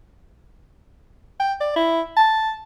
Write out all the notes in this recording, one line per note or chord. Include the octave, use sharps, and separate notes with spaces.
G5
D5
E4
A5